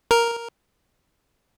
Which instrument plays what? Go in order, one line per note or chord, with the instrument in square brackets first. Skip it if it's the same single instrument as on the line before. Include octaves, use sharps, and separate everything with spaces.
[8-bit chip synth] A#4